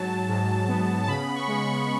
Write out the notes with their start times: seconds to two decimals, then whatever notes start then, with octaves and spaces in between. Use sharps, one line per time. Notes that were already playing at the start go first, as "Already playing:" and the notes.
Already playing: G#2 F#3 A5
0.29 G#2
0.68 B3
1.04 A5
1.08 C#3 B5
1.35 C#6
1.48 G#3
1.61 C#6